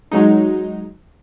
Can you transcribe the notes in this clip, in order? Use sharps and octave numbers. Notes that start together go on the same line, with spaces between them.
F#3 G#3 D#4